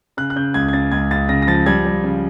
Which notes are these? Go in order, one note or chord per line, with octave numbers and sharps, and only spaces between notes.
C#3 F#6
F#6
C#3 G6
C#2 G#6
G#6
C#3 A6
C#2 G#6
C#2 A6
C#3 A#6
A#6
F3 A6
G3 G#6
G3
C#3